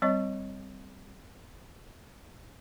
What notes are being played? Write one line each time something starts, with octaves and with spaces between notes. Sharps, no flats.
G3 C4 C#5 D#5 C#6